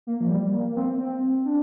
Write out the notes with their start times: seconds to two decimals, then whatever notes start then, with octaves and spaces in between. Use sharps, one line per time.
0.07 A#3
0.20 F3
0.30 G3
0.53 A#3
0.71 A#3
0.77 C4
0.99 C4
1.45 D4